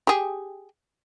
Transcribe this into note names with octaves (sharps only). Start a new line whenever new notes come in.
G4 G#4